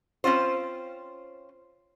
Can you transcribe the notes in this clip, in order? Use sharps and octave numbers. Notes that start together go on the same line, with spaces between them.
C4 C#4 F4 C5